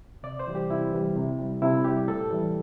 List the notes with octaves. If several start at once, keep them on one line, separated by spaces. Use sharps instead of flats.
C3 D5
C5
E3 G3
G4
C3 E4
E3 G3
C3
G3
C3 E4
G3 G4
A2 A4
E3 G3